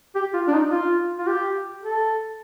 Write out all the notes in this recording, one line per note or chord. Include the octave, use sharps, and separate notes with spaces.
G4
F4
D4
D#4
F4
F4
G4
A4